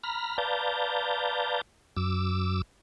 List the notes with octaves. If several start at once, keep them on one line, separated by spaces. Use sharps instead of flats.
A#5 B5 F6
B4 D5 F5 A5 A#5 G6
F#2 D6 E6